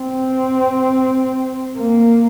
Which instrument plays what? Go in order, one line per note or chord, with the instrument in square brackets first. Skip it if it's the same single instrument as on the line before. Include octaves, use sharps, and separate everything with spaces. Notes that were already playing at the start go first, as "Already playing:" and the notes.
Already playing: [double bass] C4
A#3